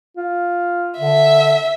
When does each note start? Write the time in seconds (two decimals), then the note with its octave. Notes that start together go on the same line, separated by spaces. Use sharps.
0.17 F4
0.99 D3 E5